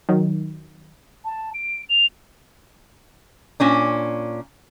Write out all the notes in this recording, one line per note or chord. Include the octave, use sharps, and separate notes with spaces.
D#3 F#3
A5
D7
F7
A#2 C#4 D4